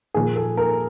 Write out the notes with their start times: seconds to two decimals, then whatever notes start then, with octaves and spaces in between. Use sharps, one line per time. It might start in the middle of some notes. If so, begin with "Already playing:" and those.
0.14 A#2 F3 A#3 G#4
0.36 A4
0.57 A#4